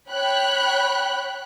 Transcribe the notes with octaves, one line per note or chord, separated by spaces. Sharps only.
C#5 G5 B5 F#6